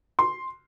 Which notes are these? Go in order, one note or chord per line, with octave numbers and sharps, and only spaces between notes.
C6